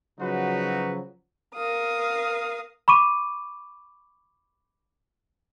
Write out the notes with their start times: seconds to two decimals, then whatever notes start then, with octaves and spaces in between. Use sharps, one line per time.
0.19 C#3 F3 F#3 D#4 F#4 B4
1.55 A#4 F5 D#6
2.88 B5 C#6 D6 D#7